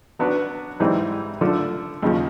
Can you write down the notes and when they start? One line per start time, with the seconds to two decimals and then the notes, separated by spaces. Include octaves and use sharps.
0.19 F#3 B3 D4 F#4 B4
0.80 G#2 E3 G3 C4 D#4
1.41 D3 F3 A3
2.02 D#2 C#3 F3